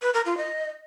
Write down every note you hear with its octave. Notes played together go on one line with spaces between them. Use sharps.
B4
A#4
F4
D#5